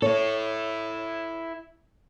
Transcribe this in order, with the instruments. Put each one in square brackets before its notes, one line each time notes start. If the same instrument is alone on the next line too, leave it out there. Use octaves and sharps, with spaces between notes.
[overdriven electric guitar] E4 A4 [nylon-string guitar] C#5